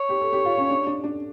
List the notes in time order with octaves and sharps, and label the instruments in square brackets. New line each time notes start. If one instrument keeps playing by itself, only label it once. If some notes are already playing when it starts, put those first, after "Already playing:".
Already playing: [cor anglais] C#5
[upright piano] G4
A4
G4
F4
C#4
D4
D4
D4